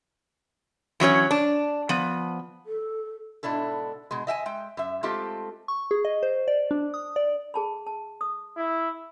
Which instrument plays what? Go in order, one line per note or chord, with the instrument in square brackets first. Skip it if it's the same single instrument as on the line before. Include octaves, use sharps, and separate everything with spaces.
[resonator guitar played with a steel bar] E3 F#3 C#4 C#5
D4
F3 B3
[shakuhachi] A4
[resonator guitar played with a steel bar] G#2 B2 D4 E4 A4
B2 G#3
D#5 E5 G5 G#5
G#3 G5
F#2 E5
G#3 A3 C4 F4 G4 A4
[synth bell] C#6
G#4
D#5
C5
D5
D4
D#6
D5
[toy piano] G#4 A5 B5
A5
D#6
[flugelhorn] E4